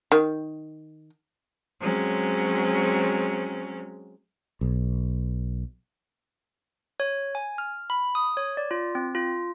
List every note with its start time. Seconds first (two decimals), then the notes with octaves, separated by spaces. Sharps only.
0.12 D#3
1.81 F#3 G#3 C4 C#4
4.61 B1
7.00 C#5
7.35 G#5
7.58 F6
7.90 B5
8.15 D#6
8.37 C#5
8.57 D5
8.71 F4
8.95 C4
9.15 F4